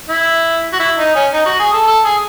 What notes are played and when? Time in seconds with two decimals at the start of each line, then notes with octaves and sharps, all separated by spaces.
0.09 E4
0.73 F#4
0.79 E4
0.98 D#4
1.15 C#4
1.33 D#4
1.46 F#4
1.59 G#4
1.73 A4
1.87 A4
2.04 G#4